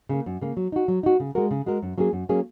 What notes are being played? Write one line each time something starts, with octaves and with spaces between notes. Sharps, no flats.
C#3 A#3
F#2
C#3 A#3
F#3
D#4 F#4
F#3
D#4 F#4
C#3
G#3 F#4 A#4
C#3
G#3 F#4 A#4
F#2
F#3 A#3 C#4 G#4
F#2
F#3 A#3 C#4 G#4